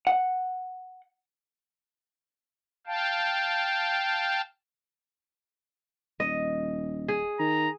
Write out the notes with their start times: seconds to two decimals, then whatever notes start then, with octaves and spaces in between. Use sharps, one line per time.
0.07 F#5
2.87 F5 G5 A5
6.20 D#1 D#5
7.08 G#4
7.39 D#3 A#5